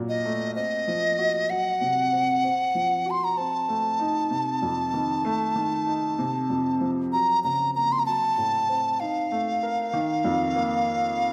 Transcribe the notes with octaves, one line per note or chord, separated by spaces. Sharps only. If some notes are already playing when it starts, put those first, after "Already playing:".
Already playing: A#2 F#3
D#5
A3
C4 D#5
F3
F#4
F#3 F#5
C3
C4
C4
F3
F#4 C6
A#5
C4 A5
A3
D#4
C3
F2
D#3
A3
D#3
D#4
C3
F2
F3
F#3 A#5
C#3 A#5
A#3 A#5
C6
A#5
F#3 A5
A2
C4
D#4 F5
A3
A#4
D#3
F2
A#3